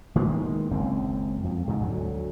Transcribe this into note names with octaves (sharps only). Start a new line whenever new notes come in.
D#3 G#3 A#3 B3
F#1 C#2 F#2 C4
F2
G#2 C3
D2 F#3